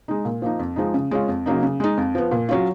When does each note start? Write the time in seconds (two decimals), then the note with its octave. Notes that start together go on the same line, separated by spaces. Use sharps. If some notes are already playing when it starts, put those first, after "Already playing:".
0.08 G#3 D#4
0.25 A#2
0.42 F3 A#3 D#4
0.59 F2
0.76 F3 G#3 D#4
0.94 C#3
1.11 G#3 C#4 F4
1.28 F2
1.46 C#3 F#3 A#3 D#4
1.63 C#3
1.80 G#3 D#4
1.97 F2
2.15 F3 B3
2.31 A#2
2.49 F#3 C#4 F4